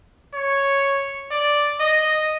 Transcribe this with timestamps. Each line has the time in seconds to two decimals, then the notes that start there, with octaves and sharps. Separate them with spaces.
0.34 C#5
1.31 D5
1.80 D#5